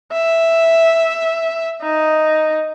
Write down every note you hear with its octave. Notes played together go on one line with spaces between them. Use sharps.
E5
D#4